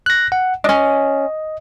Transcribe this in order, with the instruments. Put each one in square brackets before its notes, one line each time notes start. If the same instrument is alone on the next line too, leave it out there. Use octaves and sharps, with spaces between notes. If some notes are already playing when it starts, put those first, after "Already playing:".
[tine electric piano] F#6 A#6
F#5
[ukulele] C#4 D4 [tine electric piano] D#5